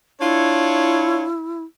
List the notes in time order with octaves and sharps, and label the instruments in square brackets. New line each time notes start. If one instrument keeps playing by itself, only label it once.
[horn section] D4 F4 C#5 [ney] E4